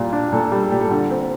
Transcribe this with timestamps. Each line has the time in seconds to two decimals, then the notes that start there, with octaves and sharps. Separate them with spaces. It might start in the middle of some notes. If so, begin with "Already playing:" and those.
Already playing: A#2 G3 F4
0.13 D4
0.32 A#2 A4
0.52 G3 A4
0.72 A#2 G4
0.81 A4
0.90 D3 G4
1.11 C4